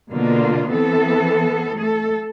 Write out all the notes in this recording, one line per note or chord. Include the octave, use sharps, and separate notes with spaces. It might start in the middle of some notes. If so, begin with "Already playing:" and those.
B2 D3 A#3 F4
E3 B3 C4 A4
A3 A4